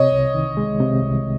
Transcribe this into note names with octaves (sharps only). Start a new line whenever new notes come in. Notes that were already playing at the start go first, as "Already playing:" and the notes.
Already playing: C3 C#5 D#5
C2
D#3
G#3
C3
C2